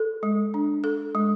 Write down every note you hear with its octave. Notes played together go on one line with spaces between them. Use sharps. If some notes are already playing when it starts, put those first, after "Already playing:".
Already playing: A4
G#3
D4
A4
G#3